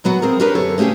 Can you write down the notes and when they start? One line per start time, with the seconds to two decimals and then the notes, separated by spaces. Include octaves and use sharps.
0.04 A#2 F#3 B3 F#4
0.22 D#2 C4 G#4 A#4
0.40 D4 G4 A#4 B4 C#5
0.55 F#2 D3 A4 C#5
0.78 C#3 A3 C#4 G4 G#4